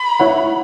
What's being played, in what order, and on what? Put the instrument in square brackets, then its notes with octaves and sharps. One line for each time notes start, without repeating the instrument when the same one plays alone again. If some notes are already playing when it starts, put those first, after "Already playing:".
Already playing: [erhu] B5
[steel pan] E4 C#5 F#5